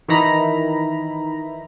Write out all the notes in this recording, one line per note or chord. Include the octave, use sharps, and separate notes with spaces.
D#3 E3 D#4 E4 A#5 B5